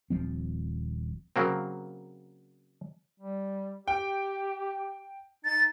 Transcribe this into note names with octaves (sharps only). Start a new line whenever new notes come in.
D#1 E2 F3 C4
C#3 F#3 A#3 C4
G3
G4 G5
D#4 A6